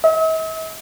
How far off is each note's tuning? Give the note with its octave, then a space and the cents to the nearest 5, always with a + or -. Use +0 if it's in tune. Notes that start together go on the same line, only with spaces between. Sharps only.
E5 -45